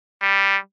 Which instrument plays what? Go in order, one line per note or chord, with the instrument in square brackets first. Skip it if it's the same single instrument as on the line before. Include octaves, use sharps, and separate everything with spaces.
[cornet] G3